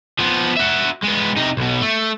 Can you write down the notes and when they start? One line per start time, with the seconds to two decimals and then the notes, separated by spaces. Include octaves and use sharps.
0.19 F3 B3
0.56 F#4 E5
1.03 G#3 B3
1.36 C3 D#4
1.57 B1 B2
1.81 A3